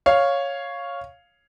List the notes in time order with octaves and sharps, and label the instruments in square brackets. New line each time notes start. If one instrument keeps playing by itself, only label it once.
[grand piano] C#5 F5